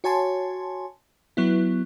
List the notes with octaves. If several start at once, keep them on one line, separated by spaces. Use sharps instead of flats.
F#4 C#5 G#5 A5 C6
F#3 B3 E4